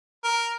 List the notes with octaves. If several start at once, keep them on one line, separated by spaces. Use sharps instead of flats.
A#4